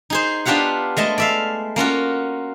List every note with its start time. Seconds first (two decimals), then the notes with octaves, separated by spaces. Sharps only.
0.10 D#4 G#4 C5
0.45 B3 D4 F4 G4 F5 F#5
0.97 G#3 A3 D#5 A5
1.18 D5 E5 F5
1.76 A#3 C#4 F4 F#4